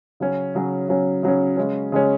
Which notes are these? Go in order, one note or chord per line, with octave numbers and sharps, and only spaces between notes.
C#3 F#3 C#4
C#3 F#3 C#4
C#3 F#3 C#4
C#3 F#3 C#4
C#3 G#3 C#4
C#3 G#3 C#4